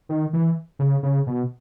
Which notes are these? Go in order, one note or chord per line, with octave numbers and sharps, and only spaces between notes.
D#3
E3
C#3
C#3
B2